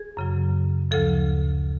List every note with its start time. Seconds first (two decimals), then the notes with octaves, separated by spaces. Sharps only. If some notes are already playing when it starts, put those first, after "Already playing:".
Already playing: G#4
0.17 F#2 C#3 F#3
0.91 D2 C#3 F3 A4